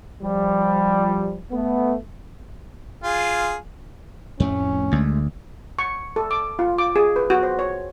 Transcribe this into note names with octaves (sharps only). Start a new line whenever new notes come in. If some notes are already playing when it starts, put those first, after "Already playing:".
F3 G3
A3 B3
F4 G#4
F2 A2 A3 C#4
D2 G#3 A3
C#6
A4
D6
F4
D6
G#4
B4
F#4
C5
C#5